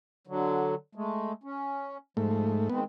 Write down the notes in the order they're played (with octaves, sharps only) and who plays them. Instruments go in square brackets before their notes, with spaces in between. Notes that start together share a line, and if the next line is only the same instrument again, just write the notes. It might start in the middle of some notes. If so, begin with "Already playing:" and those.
[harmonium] D3 F#3
G#3 A3
C#4
[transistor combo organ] G#2 A3 [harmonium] F3
[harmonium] D#3 G#3 C4 [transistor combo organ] B3